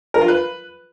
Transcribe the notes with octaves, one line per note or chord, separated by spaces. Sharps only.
A#4
F4
B4